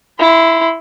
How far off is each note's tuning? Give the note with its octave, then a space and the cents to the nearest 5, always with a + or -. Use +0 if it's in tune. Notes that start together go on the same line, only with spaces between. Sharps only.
E4 +0 C6 -30